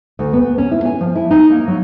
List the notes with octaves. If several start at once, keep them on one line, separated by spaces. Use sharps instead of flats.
D2
B3
C#4
E4
G#5
F3
E4
D#4
A#3
F#3